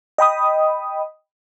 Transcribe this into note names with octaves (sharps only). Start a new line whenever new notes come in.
D#5 G5 B5 D#6